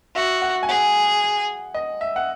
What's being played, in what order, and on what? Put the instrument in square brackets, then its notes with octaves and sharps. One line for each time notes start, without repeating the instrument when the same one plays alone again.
[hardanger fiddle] F#4 [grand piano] E5
[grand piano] F#5
G#5
[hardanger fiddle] G#4 [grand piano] F#5
[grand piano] D#5
E5
F#5